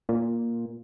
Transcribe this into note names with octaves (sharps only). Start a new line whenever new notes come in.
A#2